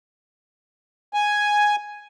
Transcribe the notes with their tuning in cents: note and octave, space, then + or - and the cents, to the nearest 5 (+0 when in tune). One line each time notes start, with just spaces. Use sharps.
G#5 +0